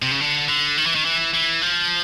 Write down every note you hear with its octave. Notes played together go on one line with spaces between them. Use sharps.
C3
C#3
D3
D3
D#3
E3
D#3
E3
E3
F3